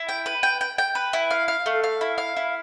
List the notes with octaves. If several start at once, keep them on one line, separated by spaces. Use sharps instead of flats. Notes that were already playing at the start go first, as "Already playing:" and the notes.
Already playing: E4
G5
B4
G5
G5
G5
B4
E4
F5
F5
A3
F5
E4
F5
E4